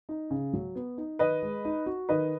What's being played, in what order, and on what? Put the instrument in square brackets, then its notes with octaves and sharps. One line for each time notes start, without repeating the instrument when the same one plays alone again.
[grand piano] D#4
C#3
F#3
B3
D#4
[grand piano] D#3 [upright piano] B4 D#5
[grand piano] G#3
D#4
F#4
[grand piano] D#3 [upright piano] B4 D#5